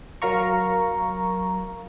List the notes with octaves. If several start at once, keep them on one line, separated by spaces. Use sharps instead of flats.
F#3 A#4 F5 A#5 C#6